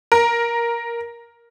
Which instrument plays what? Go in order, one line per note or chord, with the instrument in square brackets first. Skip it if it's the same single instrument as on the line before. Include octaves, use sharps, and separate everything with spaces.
[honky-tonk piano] A#4